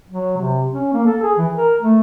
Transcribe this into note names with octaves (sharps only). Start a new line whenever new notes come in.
F#3
C3
C#4
A#3
A4
G#4
E3
A#4
A3